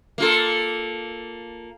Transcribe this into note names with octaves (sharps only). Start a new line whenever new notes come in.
A#3 F4 A4